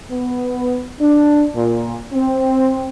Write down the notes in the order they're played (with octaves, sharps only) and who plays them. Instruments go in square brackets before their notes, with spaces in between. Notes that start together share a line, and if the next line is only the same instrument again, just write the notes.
[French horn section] B3
D4
A#2
C4